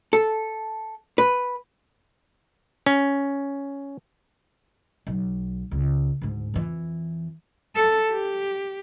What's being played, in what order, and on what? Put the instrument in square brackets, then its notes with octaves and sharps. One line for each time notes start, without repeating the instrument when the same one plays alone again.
[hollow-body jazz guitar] A4
B4
[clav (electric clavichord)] C#4
[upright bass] B1
C#2
D2 G#2
F2 E3
[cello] A4
G4